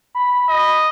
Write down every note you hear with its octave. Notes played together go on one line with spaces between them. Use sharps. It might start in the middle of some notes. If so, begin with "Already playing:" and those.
B5
D#5